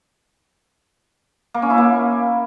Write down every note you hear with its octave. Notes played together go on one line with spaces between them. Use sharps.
A#3
C#4
E4
A#3